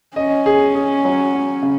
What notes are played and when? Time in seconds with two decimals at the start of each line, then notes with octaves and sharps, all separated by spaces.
0.16 C#4 D#5
0.46 G#4
0.75 G#4
1.05 F#3
1.34 F#3
1.62 C#3